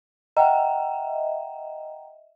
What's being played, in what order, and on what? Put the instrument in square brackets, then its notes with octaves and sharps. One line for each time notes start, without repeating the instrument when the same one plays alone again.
[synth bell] D#5 E5 [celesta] F#5 G5 A#5